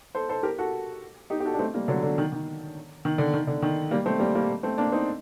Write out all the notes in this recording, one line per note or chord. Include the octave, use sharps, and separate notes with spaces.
A4 C5
A4 C5
G4 A#4
F#4 A4
D#4 G4
G4
F#4 A4
D4
A3 C4
G3 A#3
D3 F#3
D3
D#3
D#3
D#3
D3
D#3
D3
D#3
G3 A#3
A3 C4
G3 A#3
G3 A#3
A3 C4
A#3 D4
C4 D#4